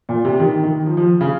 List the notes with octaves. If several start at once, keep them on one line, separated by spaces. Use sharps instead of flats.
A#2
C3
D#3
D#3
F3
F3
C#3